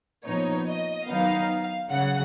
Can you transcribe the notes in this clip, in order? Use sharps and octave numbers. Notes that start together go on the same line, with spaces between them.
A#2 F3 B3 D#4 C#5
D#5
D#3 F#3 B3 D#4 F5
C#3 F#3 F#5